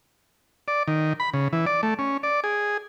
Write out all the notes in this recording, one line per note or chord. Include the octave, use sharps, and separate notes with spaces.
D5
D#3
B5
C#3
E3
D5
A3
C#4
D5
G#4